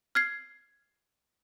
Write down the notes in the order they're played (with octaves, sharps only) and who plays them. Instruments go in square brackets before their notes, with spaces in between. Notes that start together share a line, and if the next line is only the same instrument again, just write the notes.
[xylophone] F6 G#6 C7